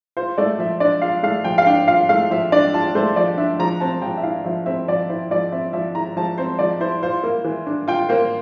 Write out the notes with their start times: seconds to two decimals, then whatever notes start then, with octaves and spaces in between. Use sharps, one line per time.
0.17 F4 C5
0.38 A3 D5
0.59 F3 E5
0.80 D4 D5
1.02 F4 F5
1.23 A3 F5
1.44 F3 G5
1.58 F5
1.66 D4 G5
1.88 F4 F5
2.09 A3 F5
2.31 F3 E5
2.52 D4 D5
2.74 F4 A5
2.95 A3 C5
3.16 F3 D5
3.37 D4 E5
3.59 F3 A#5
3.80 C4 A5
4.02 F3 G5
4.18 E5
4.23 E4 F5
4.44 F3 E5
4.66 C4 E5
4.88 F3 D5
5.09 E4 C5
5.31 F3 D5
5.52 C4 E5
5.73 F3 E5
5.95 E4 A#5
6.17 F3 A5
6.38 C4 C5
6.59 F3 D5
6.80 E4 C5
7.03 F4 C5
7.23 A#3
7.44 E3
7.67 D4
7.88 F4 G5
8.09 A#3 C5